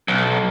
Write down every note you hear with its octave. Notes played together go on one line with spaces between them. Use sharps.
B1